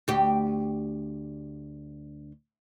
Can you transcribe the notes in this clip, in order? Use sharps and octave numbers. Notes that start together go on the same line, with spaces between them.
D2 G4